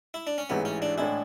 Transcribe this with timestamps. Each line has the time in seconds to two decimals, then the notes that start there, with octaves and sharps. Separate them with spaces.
0.14 E4
0.27 D4
0.38 C#4
0.50 A1 G#2 E3 B3
0.65 C#4
0.82 D4
0.98 A2 G#3 D4 E4 G#4